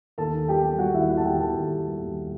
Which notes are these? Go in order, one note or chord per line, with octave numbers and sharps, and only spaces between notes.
D#2 A4 A5
D#3
G3 G4 G5
G3
G3 F#4 F#5
D#2 E4 E5
D#2 F#4 F#5
A5
D#2 G4 G5
D#2 A4 A5
D#2
G3
G3
D#2